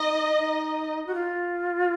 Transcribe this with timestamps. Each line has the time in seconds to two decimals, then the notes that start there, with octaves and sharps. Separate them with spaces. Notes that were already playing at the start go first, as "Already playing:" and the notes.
Already playing: D#4 D#5
0.38 D#4
1.06 F#4
1.14 F4